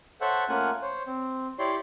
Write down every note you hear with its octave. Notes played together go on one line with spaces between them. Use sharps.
A4 C5 C#5 E5 F#5
A3 A#3 C#4 F4 F#5 G#5
C5 C#5
C4
E4 G4 C#5 D5 C6